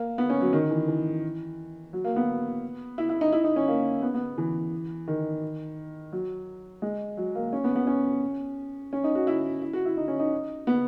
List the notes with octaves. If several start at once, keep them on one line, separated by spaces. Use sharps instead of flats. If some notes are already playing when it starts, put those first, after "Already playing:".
Already playing: A#3
B3
C#4
F#3
D#3
E3
E3
F#3
A#3
B3
E4
E4
D#4
E4
D#4
C#4
A#3
B3
B3
E3
D#3
F#3
G#3
F#3
A#3
C#4
B3
B3
C#4
C#4
D#4
F#4
E4
E4
F#4
E4
D#4
C#4
D#4
B3